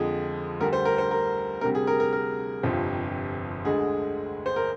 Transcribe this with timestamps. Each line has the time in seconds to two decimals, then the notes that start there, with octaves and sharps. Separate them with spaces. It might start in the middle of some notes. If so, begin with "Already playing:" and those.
Already playing: F2 D3 F3 G#3 G#4
0.60 D2 D3 G3 A#4
0.73 C5
0.85 A#4
0.98 C5
1.11 A#4
1.61 D2 C3 G3 A#4
1.75 G#4
1.87 A#4
2.00 A#4
2.13 A#4
2.63 G1 F2 C3 F3
3.65 D2 D3 G#3 G#4
4.46 C5
4.56 A#4